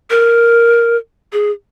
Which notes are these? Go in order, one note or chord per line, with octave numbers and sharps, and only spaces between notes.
A#4
G#4